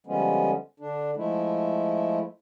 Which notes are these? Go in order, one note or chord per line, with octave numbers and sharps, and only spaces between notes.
D3 F3 G3 G#3 B3 C#4
D3 D4
F3 G#3 A3 E4